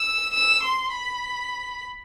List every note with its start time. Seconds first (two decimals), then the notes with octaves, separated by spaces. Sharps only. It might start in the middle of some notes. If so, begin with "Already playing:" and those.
Already playing: E6
0.34 E6
0.63 C6
0.92 B5